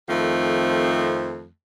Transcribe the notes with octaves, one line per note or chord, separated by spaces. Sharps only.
F2 D#3 F3 A3 C4